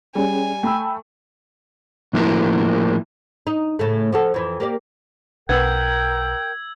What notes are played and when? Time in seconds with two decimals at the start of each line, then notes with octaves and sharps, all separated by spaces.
0.15 G3 C#4 G#4 G#5
0.63 A3 G5 B5 E6
2.13 A2 F3 A#3 E4 A#4
3.47 D#4
3.79 A2 C#3 A3
4.12 F3 F#4 A4
4.34 F2 E3
4.60 A#3 G4 D5
5.49 B1 B3 A#4 G5 E6 G6 G#6